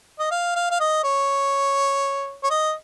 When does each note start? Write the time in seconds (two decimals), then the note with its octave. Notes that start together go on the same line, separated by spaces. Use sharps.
0.19 D#5
0.31 F5
0.56 F5
0.71 F5
0.80 D#5
1.04 C#5
2.44 C#5
2.50 D#5